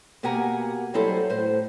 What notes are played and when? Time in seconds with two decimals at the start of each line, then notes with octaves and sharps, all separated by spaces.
0.23 B2 A#3 G4 F#5 G#5 A#5
0.94 F#3 G3 C4 E4 A4 C5
1.30 A2 C5